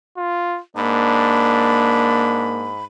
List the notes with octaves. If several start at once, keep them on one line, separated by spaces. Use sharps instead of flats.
F4
G#2 A#3 D4 B5